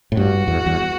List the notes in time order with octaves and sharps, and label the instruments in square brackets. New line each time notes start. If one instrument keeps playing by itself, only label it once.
[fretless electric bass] A2
[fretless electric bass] G2 [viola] F#4
[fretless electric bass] E2
E2